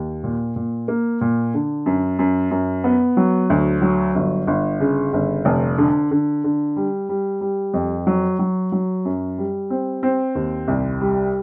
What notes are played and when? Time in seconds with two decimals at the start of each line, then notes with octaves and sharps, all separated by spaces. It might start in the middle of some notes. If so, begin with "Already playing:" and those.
Already playing: D#2
0.24 A#2
0.56 A#2
0.88 A#3
1.21 A#2
1.54 D3
1.86 F#2
2.19 F#2
2.51 F#2
2.84 B3
3.17 F#3
3.50 D2
3.82 F#3
4.15 G1
4.47 G1
4.80 C#3
5.13 G1
5.45 F1
5.78 D3
6.11 D3
6.44 D3
6.76 G3
7.09 G3
7.41 G3
7.74 F2
8.07 F#3
8.39 F#3
8.72 F#3
9.05 F#2
9.38 G3
9.70 C4
10.03 C4
10.35 D#2
10.68 C2
11.01 G3